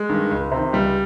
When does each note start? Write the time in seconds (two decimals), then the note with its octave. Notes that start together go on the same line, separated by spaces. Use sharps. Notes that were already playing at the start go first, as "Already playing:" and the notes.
Already playing: G#3
0.09 G2 D#3
0.31 C#2
0.52 C3
0.57 D#3
0.73 C#2 G3